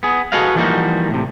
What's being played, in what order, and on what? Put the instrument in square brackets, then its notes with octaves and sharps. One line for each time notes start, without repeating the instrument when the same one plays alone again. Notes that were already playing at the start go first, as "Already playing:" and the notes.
[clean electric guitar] B3 G#4
F#4 G#4 A4 B4 D#5 F5
E3 F3 G3 A#3 D#4 F#4
A2 C3